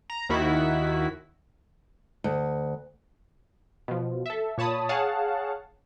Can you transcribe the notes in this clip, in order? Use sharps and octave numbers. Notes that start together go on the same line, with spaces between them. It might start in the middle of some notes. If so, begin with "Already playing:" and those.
A#5
D#2 D#3 E4 F#4 B6
D2
B2 F3
A4 E5
A#2 C#5 A5 B5 D#6
G#4 C#5 F5 F#5 A5